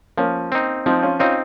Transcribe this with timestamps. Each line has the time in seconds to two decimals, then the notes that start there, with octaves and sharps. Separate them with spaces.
0.17 F3 A#3 C#4
0.52 C4 D#4
0.86 F3 C4 D#4
1.02 C#4 F4
1.19 C4 C#4 D#4 F4